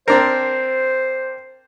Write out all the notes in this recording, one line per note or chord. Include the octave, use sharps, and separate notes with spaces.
C4 D4 A#4 C5